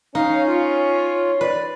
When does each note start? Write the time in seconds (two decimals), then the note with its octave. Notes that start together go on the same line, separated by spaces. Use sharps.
0.15 C#4 D#4 C#5 F5
0.47 F4
1.41 B4 D5